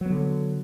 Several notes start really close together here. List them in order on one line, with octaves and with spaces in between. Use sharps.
F#3 B3 D3